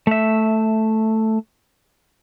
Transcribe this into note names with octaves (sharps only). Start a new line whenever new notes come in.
A3 E5